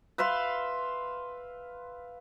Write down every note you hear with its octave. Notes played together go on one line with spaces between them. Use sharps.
B4 E5 F5 C6